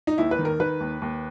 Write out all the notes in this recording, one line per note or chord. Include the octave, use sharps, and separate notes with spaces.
D#4
D#2 E4
B4
D#3
A#4
D#3 B4
D#2
D#2